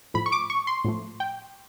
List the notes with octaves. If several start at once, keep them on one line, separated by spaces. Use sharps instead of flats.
A2 F3 A3 B5
C#6
D6
C#6
C6
A2 F3 A3
G5